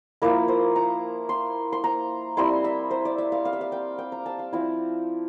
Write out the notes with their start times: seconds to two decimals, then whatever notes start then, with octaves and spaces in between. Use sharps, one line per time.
0.22 F3 A#3 E4 A#4
0.48 C5
0.76 A#5
1.29 C6
1.72 C6
1.84 A#5
2.37 G3 C4 E4 C6
2.64 E5
2.91 C5
3.05 D5
3.18 E5
3.32 F5
3.45 F5
3.53 E5
3.61 F5
3.72 G5
3.98 G5
4.12 A#5
4.26 A5
4.39 F5
4.53 F3 C4 E4